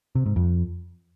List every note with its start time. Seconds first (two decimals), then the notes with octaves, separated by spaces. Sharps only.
0.15 C3
0.26 G#2
0.36 F2